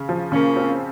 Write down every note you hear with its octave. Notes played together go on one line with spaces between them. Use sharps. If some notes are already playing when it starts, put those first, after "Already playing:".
Already playing: C#3
F3
C#3 A#3 C#4
C4